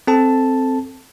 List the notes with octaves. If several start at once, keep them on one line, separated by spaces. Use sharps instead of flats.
C4 A4 A5